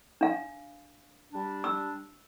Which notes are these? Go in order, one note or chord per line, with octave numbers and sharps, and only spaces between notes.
D4 F5
G3 D4
E6